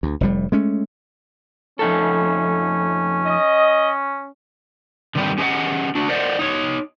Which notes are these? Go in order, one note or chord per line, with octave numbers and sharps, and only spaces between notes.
D2
F1 A2 G3
G#3 A3 C#4
F2 C#4 D#4 A4
D#5
D3 D#3 G3 C4 G4 B4
C#4 G4 G#4 B4 D#5 F#5
D4 F#4
A#4 C5 D5 D#5 F#5
D#4 C#5